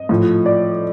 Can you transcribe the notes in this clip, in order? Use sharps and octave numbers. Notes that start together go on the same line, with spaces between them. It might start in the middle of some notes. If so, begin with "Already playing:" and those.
Already playing: D#5
A2 F3
D5